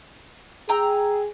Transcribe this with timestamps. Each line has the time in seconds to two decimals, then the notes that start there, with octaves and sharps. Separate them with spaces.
0.69 G#4 G5 A#5 E6